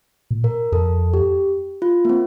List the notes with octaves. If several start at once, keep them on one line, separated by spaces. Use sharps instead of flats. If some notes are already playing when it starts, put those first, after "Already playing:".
A#2
A#4
F2 A4
G4
F4
A#3
C4